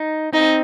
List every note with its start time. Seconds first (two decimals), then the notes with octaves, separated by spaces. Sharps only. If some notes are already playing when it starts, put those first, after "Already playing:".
Already playing: D#4
0.33 C4 D#4